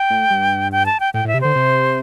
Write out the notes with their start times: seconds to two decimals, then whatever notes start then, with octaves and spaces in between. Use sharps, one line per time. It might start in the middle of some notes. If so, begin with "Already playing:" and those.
Already playing: G5
0.10 A2
0.30 G2
0.72 G5
0.86 A5
1.00 G5
1.14 A2 G5
1.25 A2
1.27 E5
1.34 C3
1.41 D3 C5
1.55 C3